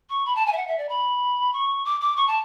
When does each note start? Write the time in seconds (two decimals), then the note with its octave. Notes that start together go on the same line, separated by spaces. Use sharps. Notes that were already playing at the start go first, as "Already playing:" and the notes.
0.09 C#6
0.25 B5
0.35 A5
0.46 G#5
0.52 E5
0.56 F#5
0.67 E5
0.77 D5
0.88 B5
1.52 C#6
1.84 D6
2.00 D6
2.16 C#6
2.27 A5